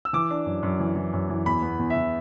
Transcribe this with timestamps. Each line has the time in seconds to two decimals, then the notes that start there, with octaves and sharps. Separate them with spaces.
0.05 E6
0.13 E3 D6
0.30 D4
0.46 F#2
0.63 F#2
0.80 E3
0.96 E3
1.13 F#2
1.29 E3
1.46 E2 B5
1.62 B3
1.79 E2
1.90 E5
1.96 E3